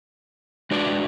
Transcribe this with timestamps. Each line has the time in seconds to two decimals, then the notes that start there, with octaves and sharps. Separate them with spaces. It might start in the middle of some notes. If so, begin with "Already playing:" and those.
0.71 G#3 D4 F#4 B4 D5